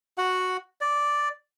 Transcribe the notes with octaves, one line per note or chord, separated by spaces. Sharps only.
F#4 F#5
D5